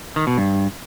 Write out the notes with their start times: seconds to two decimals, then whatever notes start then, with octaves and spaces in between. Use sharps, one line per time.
0.16 D#3
0.27 B2
0.38 G2